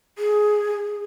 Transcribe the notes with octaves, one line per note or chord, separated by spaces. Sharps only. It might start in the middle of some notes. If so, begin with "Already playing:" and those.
G#4